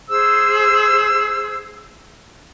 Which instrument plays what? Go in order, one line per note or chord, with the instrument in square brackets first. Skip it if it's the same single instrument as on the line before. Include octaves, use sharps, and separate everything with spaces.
[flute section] G#4 C5 E6